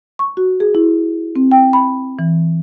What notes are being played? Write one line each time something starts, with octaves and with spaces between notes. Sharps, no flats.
C#6
F#4
G#4
E4
C4
G5
B5
E3